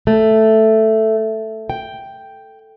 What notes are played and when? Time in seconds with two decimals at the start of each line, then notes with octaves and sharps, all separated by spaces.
0.07 A3
1.70 G5